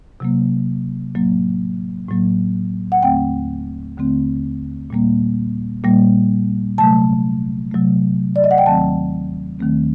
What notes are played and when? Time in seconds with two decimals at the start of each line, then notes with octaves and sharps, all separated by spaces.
0.20 C3 F#3 A#3
1.15 A2 F#3 A#3
2.09 A2 F#3 A#3
2.92 F#5
3.02 D#2 D3 A3 C4 G5
3.97 D#2 D3 A3 C4
4.90 A#2 G3 A#3
5.84 A#2 G3 A#3
6.78 C3 F#3 A3 A5
7.71 C3 F#3 A3
8.36 D5
8.44 D#5
8.51 F#5
8.58 G5
8.66 D#2 D#3 F#3 A3 C4 A5
9.59 D#2 D#3 F#3 A3 C4